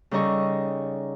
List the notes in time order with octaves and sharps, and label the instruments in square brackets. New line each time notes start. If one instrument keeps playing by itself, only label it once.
[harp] C#3 G3 D#4 A4 D#5 C#6